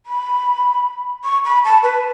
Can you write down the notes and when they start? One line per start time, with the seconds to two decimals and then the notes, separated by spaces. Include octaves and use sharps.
0.06 B5
1.24 C#6
1.45 B5
1.65 A5
1.83 B4